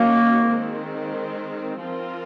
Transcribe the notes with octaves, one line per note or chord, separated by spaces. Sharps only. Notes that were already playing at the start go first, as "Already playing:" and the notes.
Already playing: D#3 F#3 A#3 C#4
D#3 G#3 C4
F3 C4 F4 A#4